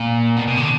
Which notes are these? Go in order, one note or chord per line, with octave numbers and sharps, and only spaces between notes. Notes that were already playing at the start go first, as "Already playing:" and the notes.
Already playing: A#2
B2
B2
D3